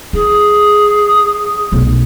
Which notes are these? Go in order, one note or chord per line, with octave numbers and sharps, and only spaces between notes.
E4 G#4
B1 A3